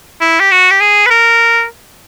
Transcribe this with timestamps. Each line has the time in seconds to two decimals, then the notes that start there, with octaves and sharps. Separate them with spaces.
0.21 E4
0.40 G4
0.51 F#4
0.71 G4
0.81 G#4
1.06 B4
1.10 A#4